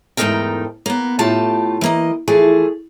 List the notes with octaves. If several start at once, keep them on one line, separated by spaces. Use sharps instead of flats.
E2 G#2 A3 D#4 A#4 G5
A#3 B3
A2 A3 F4 G4 A5
E3 A#3 D#5
E3 F3 A3 G#4